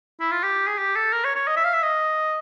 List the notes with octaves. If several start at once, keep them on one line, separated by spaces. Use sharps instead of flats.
E4
F4
G4
G#4
G4
A4
A#4
C#5
C#5
D#5
E5
F5
E5
D#5